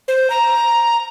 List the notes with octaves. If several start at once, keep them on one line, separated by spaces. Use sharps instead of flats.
C5
A#5